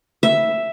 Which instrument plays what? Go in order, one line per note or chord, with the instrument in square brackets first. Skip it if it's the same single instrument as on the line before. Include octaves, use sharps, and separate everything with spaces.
[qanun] E5